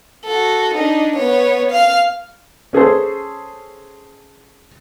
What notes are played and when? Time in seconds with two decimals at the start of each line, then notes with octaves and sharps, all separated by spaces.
0.25 F#4 A4
0.74 D4 D#4
1.16 B3 C#5
1.71 F5 F6
2.73 C#4 G#4 A4 C5